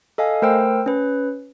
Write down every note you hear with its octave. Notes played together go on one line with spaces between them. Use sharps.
A4 D#5 F5 G#5
A3 A#4 C5 G5 E6
C#4 B4